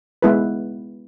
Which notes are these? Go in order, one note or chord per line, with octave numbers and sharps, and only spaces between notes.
G#3 B3 E4 B4